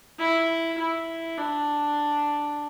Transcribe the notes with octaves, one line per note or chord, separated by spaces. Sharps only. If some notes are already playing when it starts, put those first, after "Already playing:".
E4
E4
D4